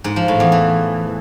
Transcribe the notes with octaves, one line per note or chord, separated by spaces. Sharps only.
G#2
F3
A2
E2
E3